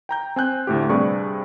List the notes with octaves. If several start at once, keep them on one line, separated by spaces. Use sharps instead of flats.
G5 A#5 G6
C4 G#5 F#6 G6
D2 A2 G4
G2 C3 G#4 D5 C#6